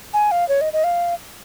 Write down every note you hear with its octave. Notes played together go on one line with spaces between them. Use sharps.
G#5
F5
C#5
D#5
D#5
F5